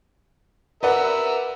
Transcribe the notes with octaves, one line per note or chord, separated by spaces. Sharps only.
A#4 B4 D5 E5 F#5